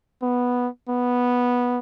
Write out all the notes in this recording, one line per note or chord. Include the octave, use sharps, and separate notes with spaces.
B3
B3